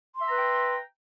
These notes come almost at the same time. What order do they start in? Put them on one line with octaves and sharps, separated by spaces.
C6 E5 A#5 B4 G5